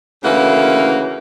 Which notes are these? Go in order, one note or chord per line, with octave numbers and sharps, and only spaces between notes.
D2 C#3 E3 A#3 A#4 F#5